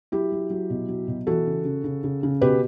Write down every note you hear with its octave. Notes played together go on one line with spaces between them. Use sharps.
F#3 E4 G4
F#3
F#3
B2
F#3
B2
E3 F#4 A4
C#3
C#3
C#3
C#3
C#3
B2 G4 B4